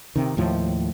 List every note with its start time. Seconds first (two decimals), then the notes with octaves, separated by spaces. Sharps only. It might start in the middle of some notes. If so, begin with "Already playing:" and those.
0.16 C3 D#3
0.37 D#2 A2 F3